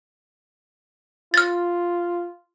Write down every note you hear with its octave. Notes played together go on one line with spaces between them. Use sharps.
F4 F6 A6